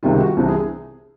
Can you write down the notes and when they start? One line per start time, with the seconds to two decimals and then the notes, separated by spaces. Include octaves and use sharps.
0.03 C#2 C3 D#3 G3 F4
0.20 F#4
0.37 C2 C3 E3
0.48 G#4